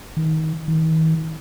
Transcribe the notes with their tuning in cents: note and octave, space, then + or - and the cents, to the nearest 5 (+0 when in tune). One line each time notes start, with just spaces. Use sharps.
D#3 +25
D#3 +45